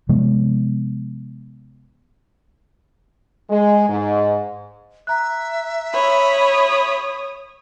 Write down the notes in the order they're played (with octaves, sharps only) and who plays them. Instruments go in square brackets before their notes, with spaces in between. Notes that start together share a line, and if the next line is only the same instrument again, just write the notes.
[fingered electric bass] C3 F3 G#3 B3
[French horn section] G#3
G#2
[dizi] E5 [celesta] A#5 F#6
[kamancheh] C#5 D#6 [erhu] B5